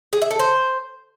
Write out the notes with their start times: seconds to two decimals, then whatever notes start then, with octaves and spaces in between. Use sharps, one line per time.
0.13 G#4
0.22 E5
0.31 A4
0.39 C5